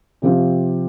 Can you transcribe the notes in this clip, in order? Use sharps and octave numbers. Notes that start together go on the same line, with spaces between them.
C3 F3 C4 F4